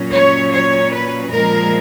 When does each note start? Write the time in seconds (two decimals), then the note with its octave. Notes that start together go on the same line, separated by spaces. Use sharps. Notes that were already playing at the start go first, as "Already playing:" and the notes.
Already playing: A#2 F#3 C#4
0.11 C#5
0.51 C#5
0.91 B4
1.30 A#2 F3 G#3 A#4